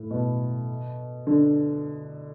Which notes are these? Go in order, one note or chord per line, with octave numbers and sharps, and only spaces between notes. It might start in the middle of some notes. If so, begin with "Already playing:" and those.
Already playing: A2
B2
D3